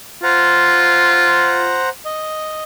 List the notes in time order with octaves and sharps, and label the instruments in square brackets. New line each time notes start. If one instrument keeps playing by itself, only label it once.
[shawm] F4 [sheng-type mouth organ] C5 F#5 A#5
[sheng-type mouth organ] D#5